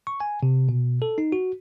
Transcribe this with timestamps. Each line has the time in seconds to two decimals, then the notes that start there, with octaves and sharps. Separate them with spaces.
0.07 C#6
0.20 G#5
0.43 C3
0.69 B2
1.02 A4
1.18 D#4
1.32 F#4